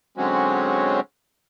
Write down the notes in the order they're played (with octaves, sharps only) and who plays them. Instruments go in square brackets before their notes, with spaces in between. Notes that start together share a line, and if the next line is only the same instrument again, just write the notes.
[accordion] D3 F#3 G#3 C4 C#4 F#4